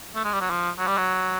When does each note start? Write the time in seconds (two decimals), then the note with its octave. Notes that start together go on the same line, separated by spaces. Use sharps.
0.16 A3
0.24 G#3
0.33 G3
0.41 F#3
0.50 F3
0.78 F#3
0.88 G3
0.98 F#3